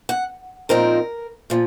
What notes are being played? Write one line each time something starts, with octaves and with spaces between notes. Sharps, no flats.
F#5
A#2 F3 C4 D#4 A#4
A#2 F3